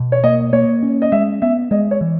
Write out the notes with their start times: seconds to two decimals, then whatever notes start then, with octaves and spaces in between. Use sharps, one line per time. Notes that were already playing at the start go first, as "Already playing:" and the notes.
Already playing: B2
0.12 C#5
0.24 A#3 D#5
0.53 A#3 C#5
0.83 C#4
1.02 D#5
1.12 G#3 E5
1.42 B3 E5
1.71 G#3 D#5
1.91 C#5
2.01 E3